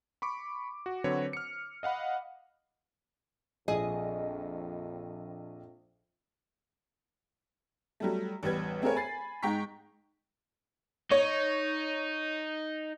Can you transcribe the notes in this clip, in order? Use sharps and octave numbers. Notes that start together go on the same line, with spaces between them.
B5 C#6 D6
F#4
D3 F#3 C4 F#4 B4 C#5
F6 C#7
D#5 F5 F#5 B5
A#1 F2 G#4 D#5
F#3 G3 A3
A1 E2 G3 B4 G#6
A3 C4 G#4 A#4 B4 C#5
G#5 B5 A6 C7
G#2 G#3 G5 A#5 C#6 B6
D#4 C#5